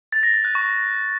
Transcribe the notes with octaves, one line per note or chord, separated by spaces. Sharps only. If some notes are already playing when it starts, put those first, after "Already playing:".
A6
A#6
A6
F#6
C#6